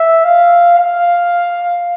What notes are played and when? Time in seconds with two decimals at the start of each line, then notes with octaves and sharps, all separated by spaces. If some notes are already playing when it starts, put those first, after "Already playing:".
Already playing: E5
0.24 F5
0.79 F5